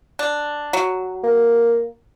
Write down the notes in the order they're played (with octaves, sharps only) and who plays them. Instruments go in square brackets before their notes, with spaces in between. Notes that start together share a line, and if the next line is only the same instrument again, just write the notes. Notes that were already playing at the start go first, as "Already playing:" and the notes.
[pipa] D4
F#3
[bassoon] A#3